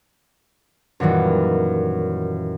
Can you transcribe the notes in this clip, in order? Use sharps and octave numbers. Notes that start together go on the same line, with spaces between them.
F#2 A#2 D#3 E3 G3 F#4